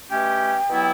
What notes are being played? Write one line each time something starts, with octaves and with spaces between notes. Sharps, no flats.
B2 A3 C#4 G4 G5
B2 F#3 B3 E4 G4